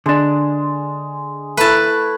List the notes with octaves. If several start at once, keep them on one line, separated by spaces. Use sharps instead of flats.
D3 G#3 D4
A3 E4 B4 A5